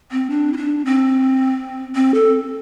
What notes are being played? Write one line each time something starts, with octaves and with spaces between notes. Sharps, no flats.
C4
D4
E4
D4
C4
C4
A4